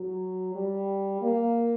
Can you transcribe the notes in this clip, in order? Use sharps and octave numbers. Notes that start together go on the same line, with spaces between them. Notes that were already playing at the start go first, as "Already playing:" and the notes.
Already playing: F#3
G3
A#3